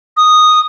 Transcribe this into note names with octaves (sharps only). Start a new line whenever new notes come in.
D#6